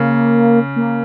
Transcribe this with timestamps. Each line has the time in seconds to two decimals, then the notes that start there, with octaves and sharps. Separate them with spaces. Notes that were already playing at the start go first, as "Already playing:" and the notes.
Already playing: C#3 A#3
0.76 A#3